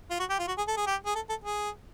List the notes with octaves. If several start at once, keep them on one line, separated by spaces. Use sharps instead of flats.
F4
F#4
G4
F4
F#4
G#4
A4
G#4
G4
G#4
A4
A4
G#4